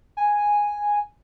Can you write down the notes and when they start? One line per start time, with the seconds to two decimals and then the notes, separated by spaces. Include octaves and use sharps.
0.17 G#5